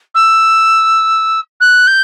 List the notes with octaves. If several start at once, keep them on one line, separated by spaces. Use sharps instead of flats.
E6
F#6
G6